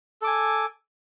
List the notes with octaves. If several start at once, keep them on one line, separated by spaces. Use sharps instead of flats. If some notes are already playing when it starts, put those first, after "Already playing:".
A4 G#5 D6